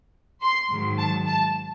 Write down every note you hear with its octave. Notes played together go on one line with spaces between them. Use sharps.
C6
G#2 D#3 F#3
A5
A5